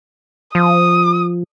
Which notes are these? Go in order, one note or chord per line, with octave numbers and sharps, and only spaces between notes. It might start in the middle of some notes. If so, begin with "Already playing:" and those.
F3 D#6